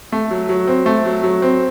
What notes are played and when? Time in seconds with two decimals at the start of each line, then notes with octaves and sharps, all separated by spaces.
0.12 A3
0.31 F#3
0.49 F#3
0.67 C4
0.86 A3
1.05 F#3
1.23 F#3
1.42 C4